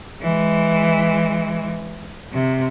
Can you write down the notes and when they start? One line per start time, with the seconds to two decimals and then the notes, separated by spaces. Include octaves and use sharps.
0.22 E3 G#3
2.33 C3